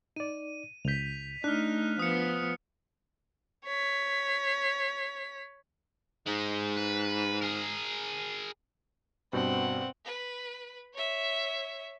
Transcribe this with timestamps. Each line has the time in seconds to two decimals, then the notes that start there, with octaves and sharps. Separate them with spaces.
0.16 D#4 D5 D#7
0.85 C#2 G6 B6 F7
1.44 A3 D4 D#4 F6 F#6
1.99 F3 B3 D#6 C#7
3.65 C#5 B6
6.27 G#2 G#3 D#4
6.77 B4
7.41 G#4 A#4
9.33 G2 B2 C4 F#5 G6
10.05 B4
10.94 C#5 E5